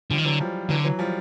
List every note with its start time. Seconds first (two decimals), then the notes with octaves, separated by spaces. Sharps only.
0.11 D3 F3 G3
0.18 D#3
0.25 D3 E3 F#3
0.40 F3 G3
0.69 D3 E3 F#3
0.84 E3 F#3
0.99 F3 G3